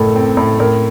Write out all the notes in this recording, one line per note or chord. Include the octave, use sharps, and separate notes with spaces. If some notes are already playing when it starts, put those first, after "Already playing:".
Already playing: F#1 A2 A3 A4
C4
A2
A2 A#4